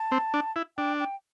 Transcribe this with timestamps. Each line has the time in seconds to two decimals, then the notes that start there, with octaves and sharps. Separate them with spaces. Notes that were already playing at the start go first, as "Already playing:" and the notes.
Already playing: A5
0.12 C4
0.34 D4
0.56 E4
0.77 D4 G5
1.00 G5